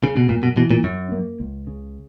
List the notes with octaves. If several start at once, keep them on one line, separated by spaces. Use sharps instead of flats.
C#3
B2
F#2 A#2
B2
B2 E3
A#2
F#2 C#4
A#3
C#2
C#3